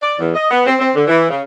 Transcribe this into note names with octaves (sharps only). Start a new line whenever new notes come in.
D5
E2
D#5
B3
C4
C4
D3
E3
C#3